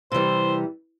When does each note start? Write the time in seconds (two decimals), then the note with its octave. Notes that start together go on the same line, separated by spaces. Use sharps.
0.12 C3 E3 G3 C5